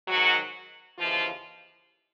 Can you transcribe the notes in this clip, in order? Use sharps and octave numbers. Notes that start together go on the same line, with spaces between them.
G#2 D#3 F#3 F#4
D#2 C#3 E3 F3 F4